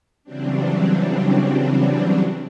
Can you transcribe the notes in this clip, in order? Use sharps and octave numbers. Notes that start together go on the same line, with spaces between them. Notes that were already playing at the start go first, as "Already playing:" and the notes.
C#3 E3 F#3 G3 C4 D4